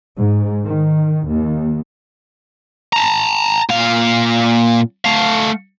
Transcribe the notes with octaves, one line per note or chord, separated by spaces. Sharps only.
G#2
D#3
D#2
A5 A#5
A#2 F5
A3 F5